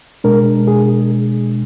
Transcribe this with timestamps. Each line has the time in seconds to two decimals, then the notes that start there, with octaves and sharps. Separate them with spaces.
0.24 B2 G#3 D4 A#4
0.67 G#4